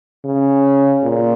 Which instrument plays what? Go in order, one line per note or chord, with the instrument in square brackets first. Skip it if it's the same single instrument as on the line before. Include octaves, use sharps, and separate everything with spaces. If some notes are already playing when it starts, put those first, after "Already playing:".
[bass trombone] C#3
A#2